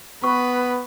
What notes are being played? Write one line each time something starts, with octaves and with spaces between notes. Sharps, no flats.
B3 B4 C#6